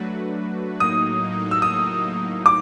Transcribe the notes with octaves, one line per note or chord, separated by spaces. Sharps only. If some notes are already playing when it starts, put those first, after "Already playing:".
Already playing: F#3 A3 D4 F#4 B4
A2 F#3 A#3 D#4 D#6
E6
D#6
D6